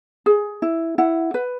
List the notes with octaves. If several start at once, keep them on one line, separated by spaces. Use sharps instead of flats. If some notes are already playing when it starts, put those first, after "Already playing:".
G#4
E4
E4 F#5
B4